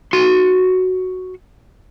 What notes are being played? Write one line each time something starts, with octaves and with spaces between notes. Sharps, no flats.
F#4 C6